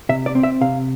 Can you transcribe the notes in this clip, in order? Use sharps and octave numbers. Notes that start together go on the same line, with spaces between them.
C3 E5
D5
C4
E5
C3 F5